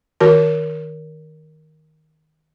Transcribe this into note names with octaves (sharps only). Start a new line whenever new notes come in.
D#3 F#4 A#4 A5